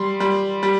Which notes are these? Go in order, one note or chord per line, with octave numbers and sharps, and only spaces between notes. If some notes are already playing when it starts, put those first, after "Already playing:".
Already playing: G3 C6
G3
G3